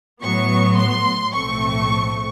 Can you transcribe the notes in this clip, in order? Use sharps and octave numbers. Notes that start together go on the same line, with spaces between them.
A2 F#3 B3 C#6
C6
B1 A2 F3 A3 C4 C#6